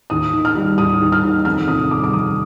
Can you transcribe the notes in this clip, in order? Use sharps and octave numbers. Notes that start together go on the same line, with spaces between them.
D#2 D#6
D#3
F6
G3
D#2 D#6
D#2
F6
D#3
F2 F6
C3 D#6
G3 D6
D6
F2 D#6